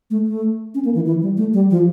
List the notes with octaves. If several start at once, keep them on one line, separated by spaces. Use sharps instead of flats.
A3
A3
C#4
A#3
E3
E3
G3
A3
G3
F3